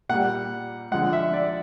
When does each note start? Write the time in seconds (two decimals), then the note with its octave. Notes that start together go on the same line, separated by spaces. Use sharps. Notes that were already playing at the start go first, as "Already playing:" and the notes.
0.09 A#2 G3 F#5
0.91 D3 F3 G#3 F#5
1.13 E5
1.33 D5